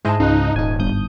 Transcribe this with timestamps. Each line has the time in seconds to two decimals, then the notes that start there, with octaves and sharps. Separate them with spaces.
0.05 G#2 G#3 E4 C5 D#5 A5
0.20 C#2 D#4 F5 F#6
0.56 D#1 D#4 G#5
0.79 G1 D#6 G6